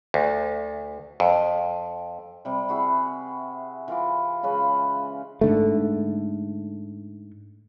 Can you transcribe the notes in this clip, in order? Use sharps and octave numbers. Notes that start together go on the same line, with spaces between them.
D2
F2
C3 G3
E4 F#4 G#4
E3 F4 D6
C#3 G#3 C#4 B4
G#2 D3 A3